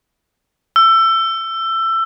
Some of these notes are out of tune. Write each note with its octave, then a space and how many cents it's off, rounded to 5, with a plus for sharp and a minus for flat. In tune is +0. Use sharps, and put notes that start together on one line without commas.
E6 +20